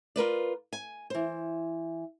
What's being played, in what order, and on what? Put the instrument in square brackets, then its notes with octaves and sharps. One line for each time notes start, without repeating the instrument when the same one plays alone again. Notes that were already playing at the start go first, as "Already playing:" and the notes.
[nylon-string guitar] F4 A#4 B4 D5
G#5
E3 C5